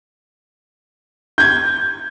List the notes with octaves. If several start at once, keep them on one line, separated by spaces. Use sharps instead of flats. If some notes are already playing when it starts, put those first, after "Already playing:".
G6 G#6